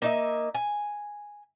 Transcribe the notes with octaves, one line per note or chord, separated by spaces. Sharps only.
A#3 D#4 E5
G#5